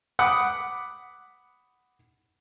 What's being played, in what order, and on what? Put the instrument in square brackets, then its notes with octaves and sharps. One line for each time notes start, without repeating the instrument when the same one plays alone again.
[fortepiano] F#5 B5 D6 D#6